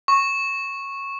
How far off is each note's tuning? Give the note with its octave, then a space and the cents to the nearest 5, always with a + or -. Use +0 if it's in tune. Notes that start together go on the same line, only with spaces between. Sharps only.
C#6 -10